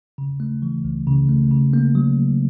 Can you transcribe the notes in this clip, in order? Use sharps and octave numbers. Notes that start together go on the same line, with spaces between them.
C#3
A3
E3
C#2
C#3
A3
C#3
A#3
F#3